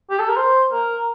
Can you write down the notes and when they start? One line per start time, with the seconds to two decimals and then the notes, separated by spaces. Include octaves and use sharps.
0.10 G4
0.19 A4
0.28 A#4
0.37 C5
0.72 A#4